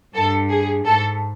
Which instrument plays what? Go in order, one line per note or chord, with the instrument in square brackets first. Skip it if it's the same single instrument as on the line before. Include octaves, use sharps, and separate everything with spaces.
[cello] G2 [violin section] A4
[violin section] G#4
[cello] G#2 [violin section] A4